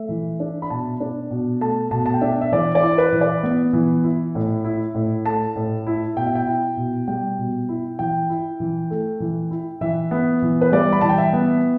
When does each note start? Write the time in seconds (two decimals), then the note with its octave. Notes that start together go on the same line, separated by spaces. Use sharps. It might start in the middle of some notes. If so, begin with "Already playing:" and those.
Already playing: A3 E5
0.09 E3
0.40 D4
0.62 B5
0.70 B2 A5
1.00 D4
1.30 B2
1.61 A3 A5
1.91 B2 A5
2.06 A5
2.14 G5
2.21 D4 E5
2.41 E5
2.52 E3 D5
2.75 D5
2.82 E4
2.98 B4
3.12 E3
3.21 D5
3.43 B3
3.73 E3
4.04 E4
4.35 A2
4.64 E4
4.95 A2
5.25 A3 A5
5.56 A2
5.87 E4
6.16 B2 G5
6.26 E5
6.35 G5
6.47 E4
6.77 B2
7.08 G3 G5
7.39 B2
7.69 E4
7.99 E3 G5
8.30 E4
8.60 E3
8.90 A3
9.20 E3
9.51 E4
9.81 E3 E5
10.11 B3
10.42 E3
10.61 B4
10.72 G3 D5
10.92 B5
11.01 E3 A5
11.09 G5
11.18 E5
11.33 B3